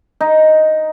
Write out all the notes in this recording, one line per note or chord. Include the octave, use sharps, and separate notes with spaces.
D#4